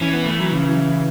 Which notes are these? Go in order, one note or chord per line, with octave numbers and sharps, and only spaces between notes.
E3 C#4
B3
A3
F#3
C#3